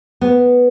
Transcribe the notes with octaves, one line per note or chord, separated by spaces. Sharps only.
B3